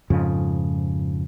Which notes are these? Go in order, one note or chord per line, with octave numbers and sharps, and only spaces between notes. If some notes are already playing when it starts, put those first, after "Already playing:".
F2 G#2 C#3 F3